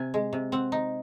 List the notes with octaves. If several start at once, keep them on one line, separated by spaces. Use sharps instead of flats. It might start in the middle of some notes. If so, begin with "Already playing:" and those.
Already playing: C3 G#5
G#3
C3
C4 F#5
D#4